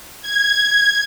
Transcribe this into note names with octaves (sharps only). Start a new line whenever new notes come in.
G#6